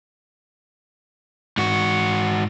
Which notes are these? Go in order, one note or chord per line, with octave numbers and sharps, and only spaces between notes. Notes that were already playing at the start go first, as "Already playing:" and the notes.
G#2 F#4